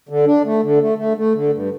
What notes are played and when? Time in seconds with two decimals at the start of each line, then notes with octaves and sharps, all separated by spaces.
0.09 D3
0.26 D4
0.45 A3
0.63 D3
0.81 A3
0.98 A3
1.17 A3
1.35 D3
1.53 G2